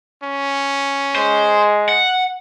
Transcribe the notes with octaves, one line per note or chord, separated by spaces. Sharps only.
C#4
G#3 C5
F#5